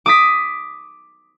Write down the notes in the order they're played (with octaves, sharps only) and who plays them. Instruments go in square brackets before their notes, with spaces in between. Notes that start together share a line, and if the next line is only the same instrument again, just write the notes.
[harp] D6 D#6 B6